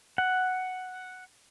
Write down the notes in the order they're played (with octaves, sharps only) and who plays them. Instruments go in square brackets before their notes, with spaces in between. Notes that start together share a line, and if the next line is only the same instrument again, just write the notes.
[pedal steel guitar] F#5